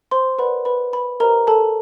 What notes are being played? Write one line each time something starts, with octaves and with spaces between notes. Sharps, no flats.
C5 C6
A#4 B4 D5 F#5 B5
B4 B5
B4 B5
G4 A#4 C5 D#5 A#5
A4 A5